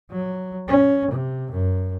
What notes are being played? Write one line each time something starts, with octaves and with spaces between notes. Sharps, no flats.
F#3
C#4
C3
F#2